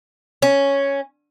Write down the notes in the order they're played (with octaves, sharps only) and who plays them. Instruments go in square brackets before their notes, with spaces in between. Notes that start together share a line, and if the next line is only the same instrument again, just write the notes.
[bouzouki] C#4